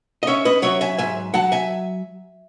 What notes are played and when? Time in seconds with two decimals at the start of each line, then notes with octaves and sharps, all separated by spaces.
0.23 D#5
0.27 C#4 C#5 E5
0.45 B4 D#5
0.62 F#3 C#5 E5
0.81 E5 G#5
0.98 G#2 E5 G#5
1.34 F#3 F#5 A5
1.52 E5 G#5